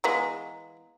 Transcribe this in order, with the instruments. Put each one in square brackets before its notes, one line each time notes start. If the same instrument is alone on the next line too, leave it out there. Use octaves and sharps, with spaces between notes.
[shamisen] E3 G#3 B3 [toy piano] F5 A#5